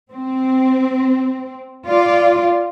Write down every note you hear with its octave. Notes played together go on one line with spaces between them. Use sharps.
C4
F4 D5